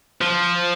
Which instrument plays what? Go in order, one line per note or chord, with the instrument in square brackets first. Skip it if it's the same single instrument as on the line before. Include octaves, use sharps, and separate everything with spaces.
[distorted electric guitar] F3